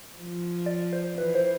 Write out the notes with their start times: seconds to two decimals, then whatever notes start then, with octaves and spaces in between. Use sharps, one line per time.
0.16 F3
0.66 D5
0.93 C5
1.17 E3 B4
1.35 C5